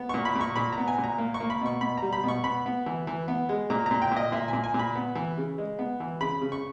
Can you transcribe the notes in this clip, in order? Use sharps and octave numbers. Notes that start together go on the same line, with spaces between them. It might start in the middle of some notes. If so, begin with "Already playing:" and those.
Already playing: B3
A#2 C#6
B5
A#2
C#6
A#2 B5
A#5
B3
G#5
A#2
A#5
A#3
C#6
A#3
B5
B2 C#6
B2 B5
G3 A#5
B5
B2 C#6
B3 B5
B3
E3
E3
B3
G#3
A#2 A#5
A#2 A#5
G5
A#2 D#5
A#2 E5
A#2 G#5
G#5
A#2
B5
B3
E3
C#3
G#3
B3
E3
C#3 B5
C#3
C#6